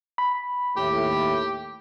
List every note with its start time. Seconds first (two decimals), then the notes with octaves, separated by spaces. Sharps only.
0.18 B5
0.77 D#2 A2 G4